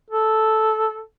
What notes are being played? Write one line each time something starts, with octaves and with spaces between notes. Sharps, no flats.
A4